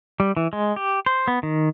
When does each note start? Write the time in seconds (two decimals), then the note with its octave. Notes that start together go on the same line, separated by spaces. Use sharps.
0.20 G3
0.37 E3
0.53 G#3
0.76 G4
1.06 C5
1.28 B3
1.43 D#3